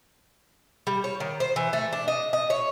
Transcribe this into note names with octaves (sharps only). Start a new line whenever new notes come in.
G3
C#5
D#3
C5
E3
A3
D4
D#5
D#5
C#5